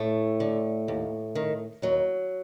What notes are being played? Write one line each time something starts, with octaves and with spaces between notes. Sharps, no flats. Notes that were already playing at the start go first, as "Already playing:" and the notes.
Already playing: A2 A3
D3
D#2
D#3
D#2 F#3